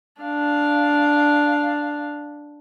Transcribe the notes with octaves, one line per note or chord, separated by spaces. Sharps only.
D4 F5